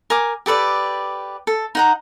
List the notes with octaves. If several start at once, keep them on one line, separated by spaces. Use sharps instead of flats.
A#4 G#5 D6
G4 A4 B4 D5
A4
D#4 F#5 A#5